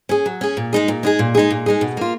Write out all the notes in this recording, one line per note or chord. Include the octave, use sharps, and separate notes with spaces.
C#4 G#4
F#3
C#4 G#4
A#2
G#3 D#4 G#4
A#2
G#3 D#4 G#4
A#2
G#3 D#4 G#4
A#2
G#3 D#4 G#4
B2
A#3 F4